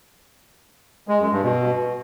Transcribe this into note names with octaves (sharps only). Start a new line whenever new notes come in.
G#3
F#2
G2
B2